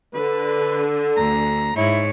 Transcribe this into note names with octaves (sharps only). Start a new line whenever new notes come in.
D3 B4
D2 A#5
G#2 E4 C#5